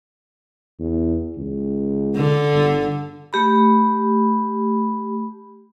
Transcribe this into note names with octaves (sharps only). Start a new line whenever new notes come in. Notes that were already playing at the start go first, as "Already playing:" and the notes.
E2
C#2
D3
G1
A3 G4 B5